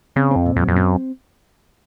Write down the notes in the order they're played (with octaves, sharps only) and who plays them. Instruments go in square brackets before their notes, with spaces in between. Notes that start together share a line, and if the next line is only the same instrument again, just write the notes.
[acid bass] C#3 [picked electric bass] C4
[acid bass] F2 [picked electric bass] C4
[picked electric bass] A#2
[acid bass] F2
[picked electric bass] F#3
[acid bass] F2
[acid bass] F#2 [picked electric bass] C4